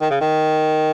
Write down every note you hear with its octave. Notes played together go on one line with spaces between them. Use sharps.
D#3
C#3
D#3